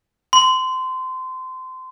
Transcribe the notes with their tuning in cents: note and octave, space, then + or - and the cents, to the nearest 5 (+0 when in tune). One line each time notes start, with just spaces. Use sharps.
C6 -25